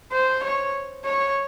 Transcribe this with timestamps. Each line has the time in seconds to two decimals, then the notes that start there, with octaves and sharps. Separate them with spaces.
0.12 C5
0.44 C#5
1.05 C#5